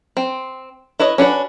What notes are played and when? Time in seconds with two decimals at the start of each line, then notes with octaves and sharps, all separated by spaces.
0.17 C4
0.99 E4 B4 C#5 D#5
1.18 C#4 D4 F#4 B4